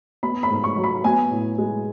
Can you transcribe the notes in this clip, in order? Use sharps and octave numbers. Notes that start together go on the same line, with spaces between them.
B3 B5
B5
G#2
C#6
F#3
B5
B3 G#5
A2
G#3